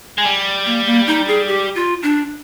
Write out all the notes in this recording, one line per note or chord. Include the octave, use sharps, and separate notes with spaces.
G#3
G3
A#3
A#3
D#4
G#4
G4
F4
D4